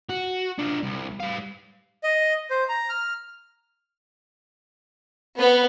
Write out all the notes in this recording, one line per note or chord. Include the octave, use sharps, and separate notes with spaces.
F#4
D4 F4
C2
G3 F5
D#5
C5
A#5
F6
B3